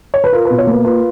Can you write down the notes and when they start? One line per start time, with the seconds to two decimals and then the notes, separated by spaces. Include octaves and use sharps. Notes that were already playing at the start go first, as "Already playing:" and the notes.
0.14 C#5
0.24 B4
0.33 F4 A#4
0.45 B4
0.50 B2
0.58 C#5
0.67 A#3 B4
0.84 F4 B4